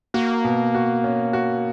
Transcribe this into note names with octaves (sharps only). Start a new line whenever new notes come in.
A#3 F#4
B2
F#4
C#4
F#4